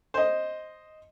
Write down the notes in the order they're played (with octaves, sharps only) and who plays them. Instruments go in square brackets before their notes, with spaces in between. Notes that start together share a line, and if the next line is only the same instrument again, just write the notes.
[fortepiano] C5 D#5